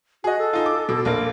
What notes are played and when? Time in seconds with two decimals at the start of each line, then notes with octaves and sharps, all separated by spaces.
0.24 F#4 G#4 D#5
0.39 A4
0.53 D#4 F4
0.66 D6
0.89 B2
1.05 A#1 A#3 A#4